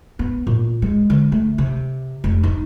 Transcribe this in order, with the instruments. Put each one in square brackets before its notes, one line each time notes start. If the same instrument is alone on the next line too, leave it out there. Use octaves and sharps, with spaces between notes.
[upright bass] B3
A#2
G#3
D3
A3
C3
F1
D#4